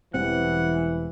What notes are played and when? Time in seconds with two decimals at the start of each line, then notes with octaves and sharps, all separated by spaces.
0.14 E1 E3 G3 C4 F#5